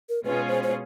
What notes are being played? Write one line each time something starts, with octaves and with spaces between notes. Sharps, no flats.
A#4
B2 G#3 C#4 F4 G#4 B4
C5
C5